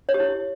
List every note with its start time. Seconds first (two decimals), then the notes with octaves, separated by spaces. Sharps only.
0.09 C#5
0.14 G4
0.20 E4